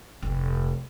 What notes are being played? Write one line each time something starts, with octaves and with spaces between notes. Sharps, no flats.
F1 A#1